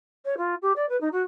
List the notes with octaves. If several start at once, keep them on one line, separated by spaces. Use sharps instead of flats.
C#5
F4
G4
D5
B4
D#4
F#4